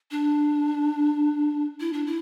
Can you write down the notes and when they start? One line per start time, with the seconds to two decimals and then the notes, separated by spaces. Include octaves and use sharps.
0.11 D4
1.80 E4
1.93 D4
2.06 E4